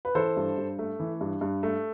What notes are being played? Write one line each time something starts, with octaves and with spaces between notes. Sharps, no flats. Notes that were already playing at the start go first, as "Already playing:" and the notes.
B4
E3 A4 C5
G2
G2
A3
E3
G2
G2
A3